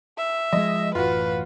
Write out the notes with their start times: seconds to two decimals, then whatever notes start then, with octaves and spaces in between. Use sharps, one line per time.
0.18 E5
0.53 F3 G3 G#3 D#5
0.95 A1 F#2 F4 F#4 B4